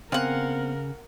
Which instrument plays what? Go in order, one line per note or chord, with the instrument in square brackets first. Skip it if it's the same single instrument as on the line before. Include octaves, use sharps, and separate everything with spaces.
[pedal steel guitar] C#3 G#5 [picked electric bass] B3 C4 [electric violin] A#4 [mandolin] F5 F#5